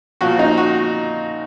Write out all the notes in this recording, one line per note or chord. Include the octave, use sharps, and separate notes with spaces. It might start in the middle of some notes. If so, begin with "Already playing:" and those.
A#2 F3 F#4
D#4
F#4